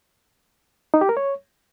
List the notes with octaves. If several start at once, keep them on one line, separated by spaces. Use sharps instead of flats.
D#4
G4
A#4
C#5